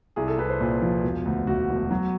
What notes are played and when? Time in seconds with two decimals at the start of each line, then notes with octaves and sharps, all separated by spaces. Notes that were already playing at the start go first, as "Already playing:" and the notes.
0.16 C2 G#4
0.28 A4
0.38 C2 B4
0.49 C5
0.60 A#2
0.82 F3
1.04 E1
1.25 D2
1.47 D2 F#4
1.70 E1
1.91 F#3